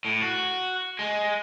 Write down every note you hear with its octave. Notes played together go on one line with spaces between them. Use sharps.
A2
F#4
G#3